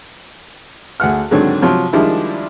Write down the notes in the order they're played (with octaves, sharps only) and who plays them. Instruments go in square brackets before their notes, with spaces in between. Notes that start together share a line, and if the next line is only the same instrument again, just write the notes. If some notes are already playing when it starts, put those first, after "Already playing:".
[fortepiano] D2 G#4 F#5 F6
G#2 D3 D#3 F#3 C4 D4
C3 F3 F#3
D#3 F3 G3 G#3 D4 E4